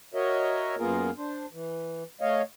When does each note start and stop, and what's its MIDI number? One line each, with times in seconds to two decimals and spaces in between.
0.14 0.76 66
0.14 0.76 70
0.14 0.76 73
0.14 0.76 75
0.14 0.76 76
0.78 1.10 42
0.78 1.10 58
0.78 1.10 59
0.78 1.10 65
0.78 1.10 68
0.78 1.10 70
1.17 1.46 62
1.17 1.46 72
1.52 2.03 52
2.21 2.42 57
2.21 2.42 73
2.21 2.42 75
2.21 2.42 77